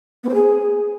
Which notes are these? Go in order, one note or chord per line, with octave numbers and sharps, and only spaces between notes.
B3
C5
G#4